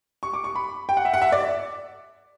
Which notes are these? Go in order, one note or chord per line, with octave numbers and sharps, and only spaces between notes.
C#6
D6
C#6
B5
G5
F#5
E5
F#5
E5
D5